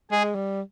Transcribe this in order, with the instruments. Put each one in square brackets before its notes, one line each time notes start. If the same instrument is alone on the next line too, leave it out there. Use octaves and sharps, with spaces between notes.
[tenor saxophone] G#3 [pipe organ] G#4
[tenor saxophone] G3